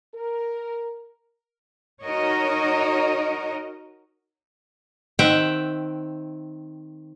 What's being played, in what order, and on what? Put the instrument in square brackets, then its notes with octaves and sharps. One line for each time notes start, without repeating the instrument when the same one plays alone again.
[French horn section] A#4
[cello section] D#4 F#4 A#4 C#5 D#5
[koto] D#3 C4 E5 F#5 G5